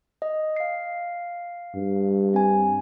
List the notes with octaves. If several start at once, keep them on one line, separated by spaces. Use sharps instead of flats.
D#5
F5 C7
G2
C4 G#5